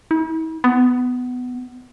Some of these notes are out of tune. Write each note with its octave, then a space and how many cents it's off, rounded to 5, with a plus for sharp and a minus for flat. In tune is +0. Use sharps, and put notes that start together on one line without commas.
E4 -45
B3 +15